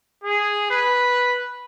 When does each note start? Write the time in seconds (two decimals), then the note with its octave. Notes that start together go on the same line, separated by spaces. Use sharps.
0.24 G#4
0.71 B4